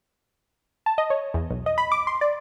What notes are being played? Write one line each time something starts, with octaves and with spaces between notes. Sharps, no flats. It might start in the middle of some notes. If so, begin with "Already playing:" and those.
A5
D#5
C#5
E2
B1
D#5
B5
D6
C6
D5